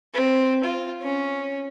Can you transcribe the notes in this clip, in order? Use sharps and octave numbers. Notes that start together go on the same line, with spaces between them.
C4
F4
C#4